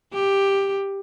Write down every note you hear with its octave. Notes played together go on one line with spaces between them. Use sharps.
G4